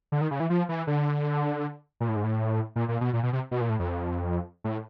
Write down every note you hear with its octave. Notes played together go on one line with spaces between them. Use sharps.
D3
D#3
C#3
E3
F3
E3
D3
A#2
A2
G#2
A2
A#2
A#2
B2
A#2
B2
C3
B2
A#2
A2
F2
A2